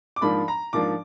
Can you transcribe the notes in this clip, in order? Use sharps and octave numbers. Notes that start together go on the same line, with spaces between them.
D6
G#2 F3 A#3 D4 B5
A#5
G#2 F3 A#3 D4 D6